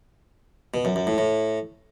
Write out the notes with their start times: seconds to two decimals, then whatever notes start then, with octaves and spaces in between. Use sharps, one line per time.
0.74 B2
0.85 F#2
0.96 F#2
1.07 A2
1.18 A2